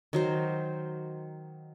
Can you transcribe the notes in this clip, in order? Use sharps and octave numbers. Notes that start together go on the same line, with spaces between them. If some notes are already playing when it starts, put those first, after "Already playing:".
D#3 F#3 C5